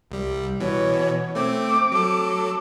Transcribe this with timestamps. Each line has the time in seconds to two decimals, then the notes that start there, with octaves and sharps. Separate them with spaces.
0.11 C2 G3
0.60 B2 E3 C#5
1.35 A3 C4 D6
1.92 F#3 A4